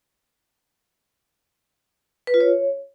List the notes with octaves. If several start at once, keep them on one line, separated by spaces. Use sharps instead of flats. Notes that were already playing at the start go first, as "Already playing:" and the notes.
B4
F4
C#5